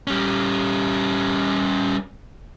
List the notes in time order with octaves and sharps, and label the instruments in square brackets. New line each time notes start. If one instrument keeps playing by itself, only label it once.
[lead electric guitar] G3 C#4